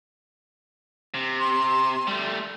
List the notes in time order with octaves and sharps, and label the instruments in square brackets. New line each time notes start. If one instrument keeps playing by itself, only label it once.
[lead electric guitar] C3
[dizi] C6
[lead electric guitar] G3 A3